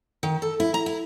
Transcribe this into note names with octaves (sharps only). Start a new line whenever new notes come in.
D#3
A4
E4
A#5
E4